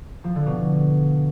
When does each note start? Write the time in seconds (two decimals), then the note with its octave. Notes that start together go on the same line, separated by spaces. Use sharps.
0.24 F3
0.35 D3
0.46 B2